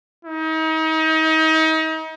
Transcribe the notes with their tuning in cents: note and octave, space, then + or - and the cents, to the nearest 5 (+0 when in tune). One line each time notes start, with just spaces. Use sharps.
D#4 +35